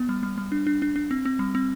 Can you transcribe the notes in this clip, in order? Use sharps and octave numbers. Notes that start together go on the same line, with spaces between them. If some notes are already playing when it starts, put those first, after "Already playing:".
Already playing: B3
G3
G3
G3
D4
D4
D4
D4
C4
C4
G3
C4